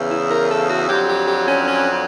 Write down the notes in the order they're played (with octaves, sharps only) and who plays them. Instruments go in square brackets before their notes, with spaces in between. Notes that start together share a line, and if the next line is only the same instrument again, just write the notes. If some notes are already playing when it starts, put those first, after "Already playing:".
Already playing: [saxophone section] E2 C#3 E3
E4
A#4
A4
F#4
F2 D3 F#3 G4
G4
G4
C#4
C#4